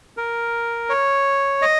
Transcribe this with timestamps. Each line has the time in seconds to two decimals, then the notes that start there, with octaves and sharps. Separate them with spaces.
0.17 A#4
0.89 C#5
1.62 D#5